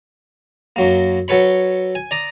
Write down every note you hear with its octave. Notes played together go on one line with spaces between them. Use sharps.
F#2 F#3 A#3
F#3 A4 B4 C#5 B5
G#5
D5 A#5 D#6